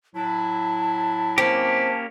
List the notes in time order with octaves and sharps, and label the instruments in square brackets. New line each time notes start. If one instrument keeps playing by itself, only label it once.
[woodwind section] A2 F#3 E4 [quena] A5
[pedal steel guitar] A#3 C#4 G4 [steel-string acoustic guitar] C4